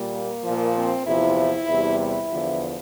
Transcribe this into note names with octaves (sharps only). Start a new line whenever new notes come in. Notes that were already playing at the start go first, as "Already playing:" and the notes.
Already playing: A#2 G3
A#3
A#2 F3
C4
E2 C3 F3 E4
E2 C3 G3
E4
E2 D3 F3